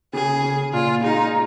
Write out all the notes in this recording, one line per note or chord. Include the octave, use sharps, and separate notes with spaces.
C#3 G#4
C#3
A#2 F4
G#3 D#4